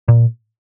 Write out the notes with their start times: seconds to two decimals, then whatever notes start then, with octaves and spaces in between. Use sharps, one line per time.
0.08 A#2